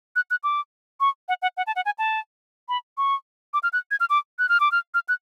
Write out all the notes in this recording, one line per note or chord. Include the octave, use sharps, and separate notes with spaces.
F#6
F#6
D6
C#6
F#5
F#5
F#5
A5
F#5
G#5
A5
B5
C#6
D6
F6
F#6
G#6
F6
D6
F#6
F6
D6
F6
F6
F#6